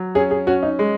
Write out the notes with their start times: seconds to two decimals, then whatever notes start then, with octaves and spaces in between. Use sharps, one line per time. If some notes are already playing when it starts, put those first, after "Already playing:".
Already playing: F#3
0.15 C#4 G#4
0.31 G#4
0.47 C#4 F#4
0.63 D#4
0.79 G#3